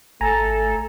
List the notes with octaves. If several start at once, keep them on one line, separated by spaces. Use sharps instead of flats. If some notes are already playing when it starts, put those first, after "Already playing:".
G#1 A3 A4 G#5 A#5